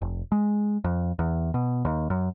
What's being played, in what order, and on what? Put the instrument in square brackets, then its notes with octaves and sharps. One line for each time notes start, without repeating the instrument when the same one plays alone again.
[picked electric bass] F1
G#3
F2
E2
B2
D#2
F#2